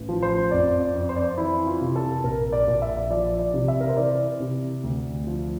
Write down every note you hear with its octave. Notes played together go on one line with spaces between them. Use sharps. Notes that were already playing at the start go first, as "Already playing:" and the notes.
Already playing: A1
F3
C5
F2 D5
D5
F2
C5
D5
C5
E3 E4
F4
C3
A4
A#1 A#4
D5
A#1
E5
F3 D5
D5
C3
E5
A#4
C5
E3 D5
C3
D2
F3